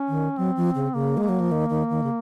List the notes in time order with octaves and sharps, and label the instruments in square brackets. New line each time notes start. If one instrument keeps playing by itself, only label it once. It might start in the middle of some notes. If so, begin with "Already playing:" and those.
Already playing: [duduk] C#4
[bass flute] D#3
[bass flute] F#3 [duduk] C4
[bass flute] F3
C#3
[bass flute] C#3 [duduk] A#3
[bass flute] G#3
[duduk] A#3
[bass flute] F#3
F3
D#3
D#3
D#3
C#3